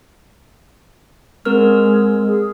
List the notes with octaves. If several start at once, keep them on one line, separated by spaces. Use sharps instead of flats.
G#3 C4 A#4 F6
G#4